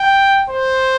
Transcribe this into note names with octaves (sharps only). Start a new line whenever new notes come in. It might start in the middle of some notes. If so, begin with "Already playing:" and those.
Already playing: G5
C5